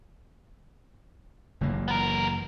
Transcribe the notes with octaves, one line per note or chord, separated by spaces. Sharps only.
F#1 E3 A#3
B3 A#4